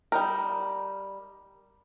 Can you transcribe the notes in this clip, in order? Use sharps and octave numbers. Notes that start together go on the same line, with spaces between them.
G3 D#4 A#4